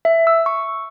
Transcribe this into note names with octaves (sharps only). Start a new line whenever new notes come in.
E5
E6
C#6